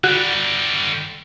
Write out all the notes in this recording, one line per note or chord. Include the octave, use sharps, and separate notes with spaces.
D3 G3 F#4